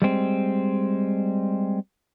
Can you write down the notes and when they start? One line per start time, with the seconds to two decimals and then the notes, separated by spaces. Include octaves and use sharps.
0.02 G3 G#3 C4